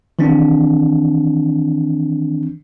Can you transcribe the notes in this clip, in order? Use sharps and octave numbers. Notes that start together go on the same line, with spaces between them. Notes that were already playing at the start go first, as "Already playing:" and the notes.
D#3 E3 C4 D4